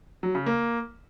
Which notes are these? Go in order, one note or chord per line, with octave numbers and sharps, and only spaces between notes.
F#3
C#3
A#3